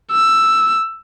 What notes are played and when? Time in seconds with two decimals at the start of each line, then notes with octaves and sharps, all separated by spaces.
0.12 E6